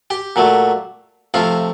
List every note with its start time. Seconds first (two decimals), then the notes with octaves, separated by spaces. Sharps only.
0.10 G4 G5
0.36 A#2 F#3 A3
1.34 C3 F3 A3 F4 F5